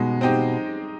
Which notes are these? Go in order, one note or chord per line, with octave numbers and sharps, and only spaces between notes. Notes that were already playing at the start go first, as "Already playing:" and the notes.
Already playing: B2 G#3 D#4
C4 D#4 G4